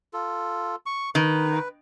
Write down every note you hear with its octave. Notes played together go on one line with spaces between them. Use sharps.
F4 A4
C#6
D#3 B4